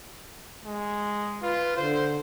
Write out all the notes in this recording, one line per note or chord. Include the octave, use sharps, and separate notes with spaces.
G#3
F4 B4
D3 C5